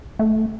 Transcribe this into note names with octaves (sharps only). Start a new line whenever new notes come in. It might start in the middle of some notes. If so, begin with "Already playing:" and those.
A3